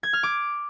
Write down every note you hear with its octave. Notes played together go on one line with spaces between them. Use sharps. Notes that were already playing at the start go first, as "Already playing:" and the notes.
G#6
F6
D6